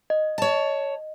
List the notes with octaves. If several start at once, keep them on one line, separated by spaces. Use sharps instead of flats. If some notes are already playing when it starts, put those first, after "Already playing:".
D#5
C#5 A5